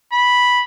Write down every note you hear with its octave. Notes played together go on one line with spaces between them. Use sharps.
B5